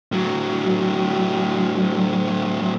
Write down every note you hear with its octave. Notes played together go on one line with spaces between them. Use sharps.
A2 F#3